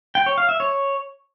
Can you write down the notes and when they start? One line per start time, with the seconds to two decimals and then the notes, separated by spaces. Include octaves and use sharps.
0.15 G5
0.26 C#5
0.38 F5
0.49 E5
0.60 C#5